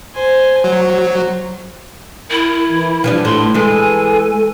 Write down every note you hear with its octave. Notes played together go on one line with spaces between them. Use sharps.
C5 G#5
F#3 C5
E4 A#4
E3
E3 F3 G3 D4
A2 C6
E3 G#3 A4 G#5